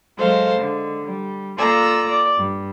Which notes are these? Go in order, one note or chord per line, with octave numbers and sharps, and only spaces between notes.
F#3 G#3 A4 C5 F5
D3 G#3
G3
A#3 F4 A4 D5 A#5 E6
D5
G2